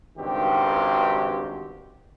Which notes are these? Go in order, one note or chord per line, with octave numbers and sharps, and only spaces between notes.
C#2 G2 D#3 C4 F#4 G4